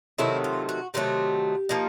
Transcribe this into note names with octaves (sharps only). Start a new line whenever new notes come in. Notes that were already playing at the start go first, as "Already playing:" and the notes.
C3 D#3 F#3 A3 E4
F4
F#4
C3 D#3 F#3 A3 G4
F3 A#3 D#4